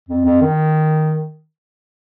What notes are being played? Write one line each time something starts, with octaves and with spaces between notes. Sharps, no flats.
F2
F2
D#3